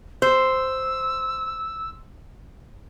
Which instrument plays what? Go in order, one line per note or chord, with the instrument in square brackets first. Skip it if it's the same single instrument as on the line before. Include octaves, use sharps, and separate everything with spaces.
[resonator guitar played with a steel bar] C5 [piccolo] E6